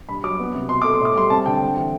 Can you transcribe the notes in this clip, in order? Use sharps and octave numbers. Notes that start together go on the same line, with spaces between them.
G2 B5
F#3 D6
B3
C3
B2 C6
A3 D6
C6
A2
D6
G3 C6
C4 A5
D3 G5
C4
E3